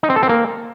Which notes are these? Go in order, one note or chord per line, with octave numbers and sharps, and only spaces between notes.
D#4
C4
A4
C4
A#3